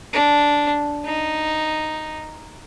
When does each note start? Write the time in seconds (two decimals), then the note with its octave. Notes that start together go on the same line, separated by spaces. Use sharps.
0.13 D4
1.05 D#4